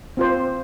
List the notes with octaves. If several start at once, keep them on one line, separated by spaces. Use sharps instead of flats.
C4 F4 C5